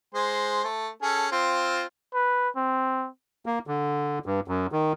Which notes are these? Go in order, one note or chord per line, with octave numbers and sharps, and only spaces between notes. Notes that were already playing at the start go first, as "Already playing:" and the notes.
G#3 C5 G#5
A3
C#4 G#4 A4
C4 F4
B4
C4
A#3
D3
G2
F#2
D#3